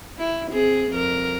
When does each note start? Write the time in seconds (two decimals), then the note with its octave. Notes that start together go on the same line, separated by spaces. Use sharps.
0.19 E4
0.51 C4 G#4
0.92 F2 A#4